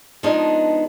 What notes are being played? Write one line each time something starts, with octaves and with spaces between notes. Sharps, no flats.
F3 G#3 B3 D4 D#4